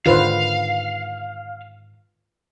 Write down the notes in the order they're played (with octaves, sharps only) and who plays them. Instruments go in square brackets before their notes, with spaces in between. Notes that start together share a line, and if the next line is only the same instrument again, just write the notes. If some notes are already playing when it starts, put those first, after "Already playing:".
[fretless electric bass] G#2 D3 D#3 [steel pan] F4 B4 C5 [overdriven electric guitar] F5